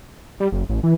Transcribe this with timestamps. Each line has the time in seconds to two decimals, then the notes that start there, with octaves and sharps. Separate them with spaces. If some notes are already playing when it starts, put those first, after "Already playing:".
0.40 G3
0.52 F#1
0.69 A1
0.83 E3